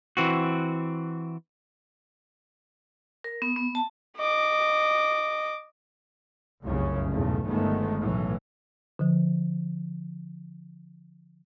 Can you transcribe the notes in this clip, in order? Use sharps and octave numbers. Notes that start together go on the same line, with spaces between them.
E3 C4 F#4
A#4
B3
B3
A5
D#5 D6
F1 C2 F#2 C#3 C#4
B1 E2 G#2 C#3 A3
G1 D#3 G#3 A3 B3
B1 A2 E3 F#3
D3 F3